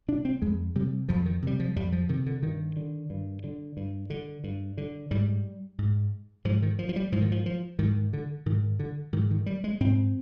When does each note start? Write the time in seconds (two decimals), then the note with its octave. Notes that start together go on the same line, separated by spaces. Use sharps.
0.08 C3 D4
0.25 C4
0.42 F2 G#3
0.75 C3 G3
1.09 F2 F3
1.26 D#3
1.42 C3 G3
1.60 F3
1.76 F2 G3
1.92 F3
2.09 C3 D#3
2.26 D3
2.42 G2 D#3
2.76 D3
3.10 G2
3.44 D3
3.77 G2
4.10 D3
4.44 G2
4.77 D3
5.11 G#2 G3
5.78 G#2
6.45 G#2 F3
6.62 D#3
6.79 F3
6.89 F3
6.96 G3
7.12 G#2 F3
7.22 D#3
7.32 F3
7.46 F3
7.79 G#2 D#3
8.13 D3
8.46 G#2 D#3
8.79 D3
9.13 G#2 D#3
9.31 D#3
9.46 G3
9.64 G#3
9.80 G#2 C4